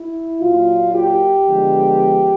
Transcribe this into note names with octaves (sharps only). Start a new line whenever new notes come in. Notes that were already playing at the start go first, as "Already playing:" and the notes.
Already playing: E4
A#2 F#3 A#3 F4
G4
D3 F3 G#3 B3